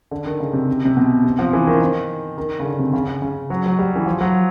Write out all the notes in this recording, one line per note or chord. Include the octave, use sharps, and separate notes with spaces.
D3
D#3
C#3
C3
C3
B2
C3
F3
E3
D#3
D#3
D#3
C#3
D3
C3
C#3
C#3
C#3
F#3
F#3
G3
E3
F3
F#3